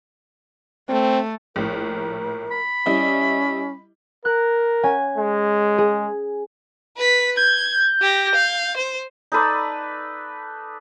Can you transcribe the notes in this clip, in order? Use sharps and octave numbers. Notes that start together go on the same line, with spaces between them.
A3 C4
A#1 A2 A#4
B5
G3 C#4 E4 D#5
A#4 F#6
C#4 G#5
G#3
G#4
B4 B6
G6 G#6
G4 A#6
F5
C5
D#4 A4 B4 D5